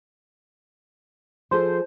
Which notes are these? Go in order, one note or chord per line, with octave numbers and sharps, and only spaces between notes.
F3 G#4 A4 C5